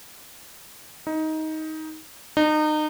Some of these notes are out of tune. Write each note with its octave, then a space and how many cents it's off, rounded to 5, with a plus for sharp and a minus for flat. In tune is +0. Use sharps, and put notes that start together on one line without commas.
D#4 +15
D#4 -30